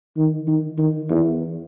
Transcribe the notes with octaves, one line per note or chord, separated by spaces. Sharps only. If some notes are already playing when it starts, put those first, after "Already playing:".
D#3
D#3
D#3
E2